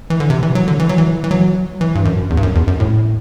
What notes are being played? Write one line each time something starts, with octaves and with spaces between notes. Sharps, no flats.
E3
D3
C3
E3
F#3
D3
E3
F#3
E3
E3
F#3
E3
G2
F#2
E2
G2
F#2
E2
F#2
A2